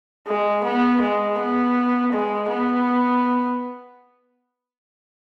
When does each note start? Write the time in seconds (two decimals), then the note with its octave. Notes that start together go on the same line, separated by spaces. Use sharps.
0.27 G#3
0.64 B3
1.01 G#3
1.38 B3
2.12 G#3
2.49 B3